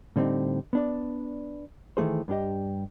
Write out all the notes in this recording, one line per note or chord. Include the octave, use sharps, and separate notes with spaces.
A2 D3 G3 C4 D#4
B3 D4 D5
D#3 E3 A3 G#4 C5
G2 D4 G4 D#5